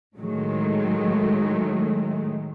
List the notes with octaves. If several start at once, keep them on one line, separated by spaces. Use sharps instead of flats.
A2 D#3 F#3 G#3 A3